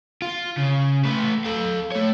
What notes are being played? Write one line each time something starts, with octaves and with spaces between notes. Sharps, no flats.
F4
C#3
A3 B4
A4 F5
A3 C#5